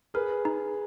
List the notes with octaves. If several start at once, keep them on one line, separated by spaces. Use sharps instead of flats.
G#4 A#4 B4
D#4